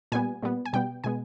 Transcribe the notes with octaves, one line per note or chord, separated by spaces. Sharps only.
A#2 G3 B3 G#5
A#2 G3 B3
G#5
B2 G3 B3 G5
B2 G#3 B3 G#5